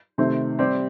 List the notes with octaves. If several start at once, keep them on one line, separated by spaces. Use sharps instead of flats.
C3 D#3 A3 C4
G3 C4 G4 D5